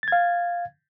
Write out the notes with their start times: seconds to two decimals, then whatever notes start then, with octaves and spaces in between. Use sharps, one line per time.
0.03 A6
0.08 G#6
0.12 F5